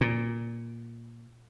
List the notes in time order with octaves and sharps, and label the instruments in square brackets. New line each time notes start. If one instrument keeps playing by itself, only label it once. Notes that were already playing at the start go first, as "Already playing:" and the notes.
[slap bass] A#2